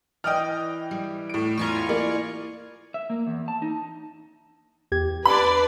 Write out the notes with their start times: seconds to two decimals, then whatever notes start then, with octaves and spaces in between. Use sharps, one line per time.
0.24 E3 D5 D#5 G5 D#6 F6
0.91 G3
1.29 A2 D7
1.58 E2 E4 F4 G#5 A#5 C#6
1.89 A#3 D5
2.94 E5
3.10 A#3
3.27 E2
3.48 A5
3.62 D#4
4.92 E2 G4 G#6
5.26 D4 B4 D5 B5